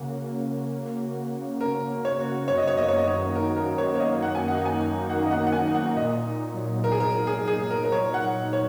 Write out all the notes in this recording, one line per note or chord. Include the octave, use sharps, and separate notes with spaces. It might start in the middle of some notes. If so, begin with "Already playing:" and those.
Already playing: C#3 A#3 C#4 F#4
C#3
C#4
A#3
F#4
C#3
C#4 A#4
A#3
C#5
F#4
F#2 C#5
D#5
C#5
A#3 D#5
C#5
D#5
D#3 C#5
D#4 A#4
A#4
F#2
C#5
A#3 C#5
D#5
D#3 F#5
G#5
D#4 F#5
G#5
F#2
A#3 F#5
D#5
F#5
D#3
F#5
G#5
D#4
F#5
A#2 D#5
D#4
F#3
A#2 A#4
G#4
A#4
A#2
G#4
D#4
G#4
F#3 A#4
A#4
C#5
A#2
F#5
A#2
C#5